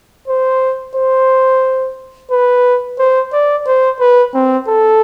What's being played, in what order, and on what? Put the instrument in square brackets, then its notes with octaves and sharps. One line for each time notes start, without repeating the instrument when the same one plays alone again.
[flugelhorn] C5
C5
B4
C5
D5
C5
B4
C4
A4